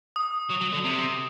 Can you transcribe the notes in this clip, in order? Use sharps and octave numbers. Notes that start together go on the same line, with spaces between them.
D#6
F#3
F#3
D3
C3